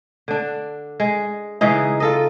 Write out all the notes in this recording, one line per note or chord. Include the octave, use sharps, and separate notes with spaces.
D3 D4
G#3
C#3 E3 G#3 D#4
F4 A4 D#5